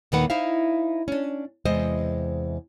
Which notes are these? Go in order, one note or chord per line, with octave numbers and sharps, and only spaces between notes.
D#2 A#2 D#3 A#3 B4 F#5
D#4 E4 C5 E5 F5
C#4 D4
E2 C3 G#3 C5 D#5